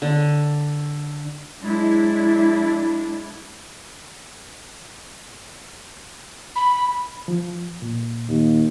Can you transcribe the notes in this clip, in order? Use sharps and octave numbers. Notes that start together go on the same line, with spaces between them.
D3
F#3 G#3 D4 E4
B5
F3
A#2
D#2